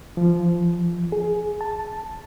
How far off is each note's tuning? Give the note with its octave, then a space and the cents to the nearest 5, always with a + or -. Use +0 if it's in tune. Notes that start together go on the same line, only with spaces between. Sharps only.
F3 -15
G#4 +15
A5 +0